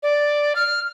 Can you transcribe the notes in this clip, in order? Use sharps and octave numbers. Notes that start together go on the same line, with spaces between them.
D5
F6